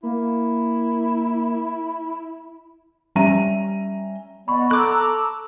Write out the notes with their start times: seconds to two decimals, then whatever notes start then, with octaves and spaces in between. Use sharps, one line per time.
0.03 A#3 E4
3.15 G3 C#4 E5 A#5 D#7
4.48 B3 D5 D#5 F#5 B5 C#6
4.71 A4 A#5 D6 E6 F#6